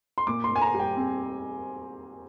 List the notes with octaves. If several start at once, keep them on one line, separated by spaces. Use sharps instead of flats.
C6
A#2 D6
C6
A#2
G#5
A#5
G3
G5
C4